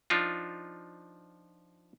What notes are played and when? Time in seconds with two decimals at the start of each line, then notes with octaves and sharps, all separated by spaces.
0.10 F3 D4 D#4 F4